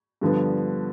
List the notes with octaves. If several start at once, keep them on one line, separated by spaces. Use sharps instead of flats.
G2 D3 F3 B3